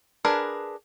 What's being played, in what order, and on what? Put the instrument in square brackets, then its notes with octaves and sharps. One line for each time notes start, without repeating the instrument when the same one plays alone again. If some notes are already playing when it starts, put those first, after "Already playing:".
[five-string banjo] D4 G#4 A#4 B4